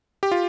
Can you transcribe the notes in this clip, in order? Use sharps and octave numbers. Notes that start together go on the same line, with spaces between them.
G4
F4